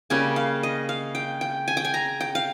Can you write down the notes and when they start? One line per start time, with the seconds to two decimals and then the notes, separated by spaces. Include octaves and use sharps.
0.10 C#3 G3 A#3 G#5
0.36 F5
0.63 D#5
0.89 F5
1.15 G5
1.41 G5
1.68 G#5
1.77 G5
1.85 G#5
1.94 A#5
2.21 G5
2.35 F5